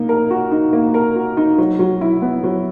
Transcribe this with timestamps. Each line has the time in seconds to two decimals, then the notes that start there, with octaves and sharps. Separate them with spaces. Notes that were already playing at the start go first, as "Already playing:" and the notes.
Already playing: A#3 D#4
0.09 A#4
0.30 F#4
0.51 D#4
0.73 A#3
0.94 A#4
1.16 F#4
1.37 D#4
1.58 F#3
1.79 F#3
2.01 E4
2.22 B3
2.44 F#3